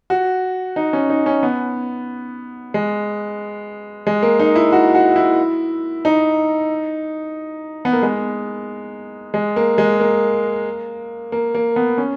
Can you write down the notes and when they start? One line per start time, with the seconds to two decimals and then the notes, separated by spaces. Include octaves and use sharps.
0.10 F#4
0.76 D#4
0.93 C#4
1.10 D#4
1.26 C#4
1.43 B3
2.74 G#3
4.07 G#3
4.23 A#3
4.39 D#4
4.55 E4
4.72 F#4
4.95 F#4
5.16 E4
6.05 D#4
7.85 B3
7.93 A#3
8.02 G#3
9.34 G#3
9.56 A#3
9.78 G#3
10.00 A#3
11.32 A#3
11.55 A#3
11.76 B3
11.98 C#4